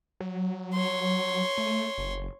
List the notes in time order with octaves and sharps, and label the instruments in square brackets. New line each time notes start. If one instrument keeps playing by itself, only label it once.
[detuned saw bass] F#3
[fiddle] C#5 C6
[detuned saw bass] A3
F#1